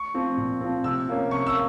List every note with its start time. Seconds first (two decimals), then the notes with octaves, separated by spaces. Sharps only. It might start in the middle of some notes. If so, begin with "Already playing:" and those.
Already playing: C#6
0.14 F3 C4
0.37 A#2
0.61 F3 C4
0.84 C3 E6
1.08 F3 A#3 C#4
1.30 C3 C#6
1.46 E6
1.54 A#3